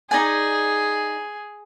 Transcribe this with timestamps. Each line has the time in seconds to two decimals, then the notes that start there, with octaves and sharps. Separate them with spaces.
0.11 D#4 G#4 D5 G#5